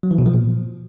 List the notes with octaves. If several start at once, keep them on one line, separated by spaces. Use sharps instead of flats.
F#3
E3
B2
F3
A#2